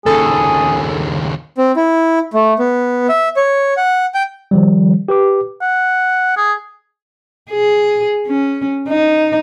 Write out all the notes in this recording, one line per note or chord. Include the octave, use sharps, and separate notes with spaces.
D#2 C#3 G#4 A4
C4
E4
A3
B3
E5
C#5
F#5
G5
D#3 F3 G3
G4 B4 D6
F#5
G#4
G#4
C#4
D#4